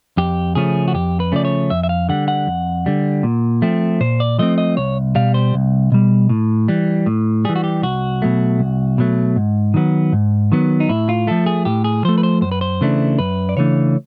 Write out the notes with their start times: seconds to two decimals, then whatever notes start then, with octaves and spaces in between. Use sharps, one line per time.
0.17 F2 G4
0.55 C#3 F3 A3 C#4 G#4
0.88 F#4
0.94 F2 G4
1.20 B4
1.32 C#3 F3 A3 C#4 D5
1.45 C#5
1.70 F2 E5
1.83 E5
1.89 F5
2.09 D3 G3 F#5
2.28 F#5
2.47 F2
2.86 D3 G3
3.23 A#2
3.62 F3 A3 C4
4.00 A#2 C5
4.20 D5
4.39 F3 A3 C4 D#5
4.58 D#5
4.77 C2 C#5
5.15 B2 G3 F5
5.34 C5
5.54 C2
5.92 B2 G3
6.29 A2
6.68 E3 G3
7.06 A2
7.45 E3 G3 G#4
7.56 F#4
7.64 G4
7.83 C2 F#4
8.22 B2 F#3 A3
8.59 C2
8.98 B2 F#3 A3
9.36 G#2
9.74 D#3 F#3 B3
10.13 G#2
10.52 D#3 F#3 B3
10.80 D#4
10.89 A2 E4
11.09 F4
11.27 F3 A3 A4
11.46 G#4
11.65 A2 G4
11.84 G#4
12.05 F3 A3 C5
12.18 B4
12.23 C5
12.42 F#2 C5
12.52 B4
12.61 C5
12.81 C#3 E3 A3 D4
13.19 F#2 B4
13.49 D5
13.57 C#3 E3 A3 D4 C#5